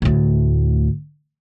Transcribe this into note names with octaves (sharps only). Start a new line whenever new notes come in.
D2 A2